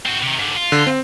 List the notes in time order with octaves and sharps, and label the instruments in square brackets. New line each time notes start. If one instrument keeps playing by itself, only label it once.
[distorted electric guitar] C4 F#4
C3 D#3
G#2 D3
F4
[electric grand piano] D3
C4